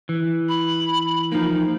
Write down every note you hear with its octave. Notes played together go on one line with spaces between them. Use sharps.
E3
B5
F3 A#3 D#4